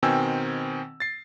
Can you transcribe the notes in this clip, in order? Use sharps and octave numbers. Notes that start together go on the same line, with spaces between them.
B2 D#3 C4 G5 G#5 E6
A6 C7